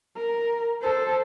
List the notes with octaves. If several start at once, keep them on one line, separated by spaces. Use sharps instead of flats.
A#4
A4 C5